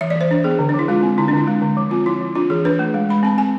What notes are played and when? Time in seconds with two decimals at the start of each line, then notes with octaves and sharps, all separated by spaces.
0.01 E3 E5
0.10 D5
0.16 E3
0.21 C5
0.31 D4
0.44 B3 G#4
0.59 D3
0.69 D4
0.74 F3
0.79 E4
0.88 G#3 F4
1.03 C4
1.18 D3 E4
1.28 D4
1.33 D3 E4
1.48 G#3
1.62 D3
1.77 F3
1.91 C4 F4
2.06 F3 E4
2.21 F3
2.35 D4 F4
2.50 E3 G#4
2.65 D4 B4
2.79 A3
2.94 G#3
3.09 G#3 B5
3.23 C4 A5
3.38 C4 G#5